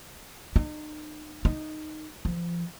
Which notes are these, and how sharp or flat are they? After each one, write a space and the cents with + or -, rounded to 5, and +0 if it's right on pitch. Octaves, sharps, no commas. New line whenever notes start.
D#4 -40
D#4 -10
F3 -30